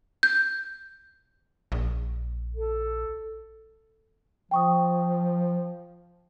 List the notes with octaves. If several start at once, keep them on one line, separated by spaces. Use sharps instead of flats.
G6
A#1
A4
F3 G5 C#6 D#6